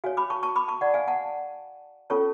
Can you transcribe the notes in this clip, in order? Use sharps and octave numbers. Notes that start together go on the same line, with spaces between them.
F#4 C#5 F5 G#5
B5 D6
A5 C#6
A5 C#6
B5 D6
A5 C#6
D5 F#5
F5 G#5
F#5 A5
C#4 F4 A4 C#5 A5 C#6